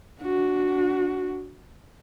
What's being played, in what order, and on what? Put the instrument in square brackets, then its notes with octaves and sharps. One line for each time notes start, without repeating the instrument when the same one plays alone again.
[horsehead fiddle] D4 F#4